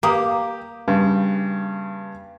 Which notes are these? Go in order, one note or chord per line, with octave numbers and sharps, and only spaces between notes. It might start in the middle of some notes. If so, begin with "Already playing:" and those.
A#3 G4 D#6
G2 C#3